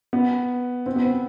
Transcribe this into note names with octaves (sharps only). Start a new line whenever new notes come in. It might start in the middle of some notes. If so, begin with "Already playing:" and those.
B3
C4
B3
C4